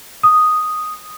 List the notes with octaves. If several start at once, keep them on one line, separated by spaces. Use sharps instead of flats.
D#6